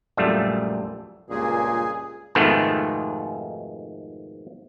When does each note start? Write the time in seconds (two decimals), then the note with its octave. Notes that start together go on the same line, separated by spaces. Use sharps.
0.17 A#1 F#2 G3 A3 F4
1.30 C#2 G2 A#2 G#4
2.35 F2 G#2 B2 D#3 A3 B3